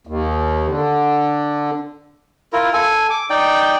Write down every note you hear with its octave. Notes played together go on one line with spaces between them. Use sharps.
D#2
D3
E4 F4 A#4
A4 G#5
D6
D#4 D5 G5